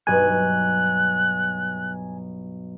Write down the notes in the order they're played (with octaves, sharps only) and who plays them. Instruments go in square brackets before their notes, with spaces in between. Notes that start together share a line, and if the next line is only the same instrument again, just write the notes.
[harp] B1 G2 [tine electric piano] G#5 [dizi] F#6